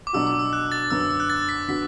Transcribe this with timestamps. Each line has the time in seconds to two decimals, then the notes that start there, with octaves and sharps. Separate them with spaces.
0.07 D6
0.13 B2 F#3 D4 F#4 E6
0.27 D6
0.39 E6
0.53 F#6
0.72 A6
0.90 F#2 D3 B3 E6
1.01 E6
1.11 E6
1.20 F#6
1.30 A6
1.49 B6
1.68 D3 B3 F#4 B6